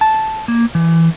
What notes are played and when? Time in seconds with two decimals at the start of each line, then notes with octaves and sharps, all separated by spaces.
0.01 A5
0.48 A#3
0.75 E3